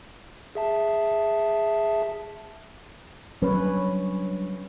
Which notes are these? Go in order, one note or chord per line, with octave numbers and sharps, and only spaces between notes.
G#4 E5 A5
F#3 G3 C#4 D4 B4 C#5